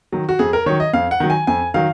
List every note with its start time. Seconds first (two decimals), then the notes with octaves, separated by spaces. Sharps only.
0.12 D#3 F#3
0.29 F#4
0.39 F2 G#4
0.53 A#4
0.66 D#3 F#3 C#5
0.80 D#5
0.93 F2 F5
1.11 F#5
1.20 D#3 F#3
1.30 G#5
1.47 F2 G#5
1.74 D#3 F#3 F5